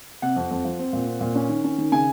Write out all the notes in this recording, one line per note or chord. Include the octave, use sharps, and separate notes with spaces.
C3 F#5
F2
F2
F3
C4
A#2
C4
A#2
C#4
D#3
C#4
D#3
C#3 G#5